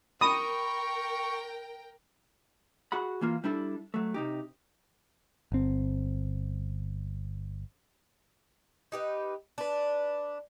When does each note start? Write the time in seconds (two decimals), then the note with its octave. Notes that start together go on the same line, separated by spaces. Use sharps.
0.21 A#4 G5 B5 C#6 D#6
2.92 F#4 G#4 F#5 B5
3.21 E3 A#3 F4
3.44 G3 D4 E4 A4
3.94 F#3 A3
4.14 C3 D#4 G4
5.52 G1 C4
8.92 D#4 G4 B4
9.58 D4 B4